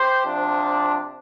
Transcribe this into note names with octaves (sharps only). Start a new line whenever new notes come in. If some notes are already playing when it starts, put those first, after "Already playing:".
Already playing: G4 C5
C3 F3 D4